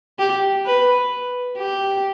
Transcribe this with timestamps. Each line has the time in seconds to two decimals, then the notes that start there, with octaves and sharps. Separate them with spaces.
0.19 G4
0.66 B4
1.58 G4